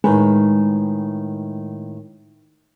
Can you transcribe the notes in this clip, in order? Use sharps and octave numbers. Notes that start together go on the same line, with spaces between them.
A2 D#3 G#3 B4